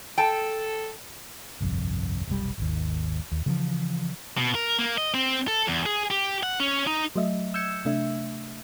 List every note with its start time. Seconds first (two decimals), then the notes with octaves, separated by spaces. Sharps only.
0.18 A4 G5 A5
1.61 G1 C2 F2
2.27 F1 B1 G3
2.58 G#1 D#2
3.32 D#2
3.46 C#3 E3 F3
4.37 B2
4.55 A#4
4.79 A#3
4.98 D#5
5.14 C4
5.48 A4
5.68 E2
5.86 G#4
6.11 G4
6.43 F#5
6.60 C#4
6.87 D#4
7.16 F#3 A3 D#5 E5
7.54 E6 G6 G#6 C#7 E7
7.85 C3 A3 D4 E5